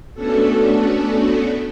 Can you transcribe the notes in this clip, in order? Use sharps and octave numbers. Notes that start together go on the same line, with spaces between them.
A3 B3 C#4 D4 F#4 A4